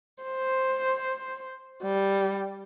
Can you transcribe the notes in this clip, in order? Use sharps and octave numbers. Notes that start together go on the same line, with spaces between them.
C5
G3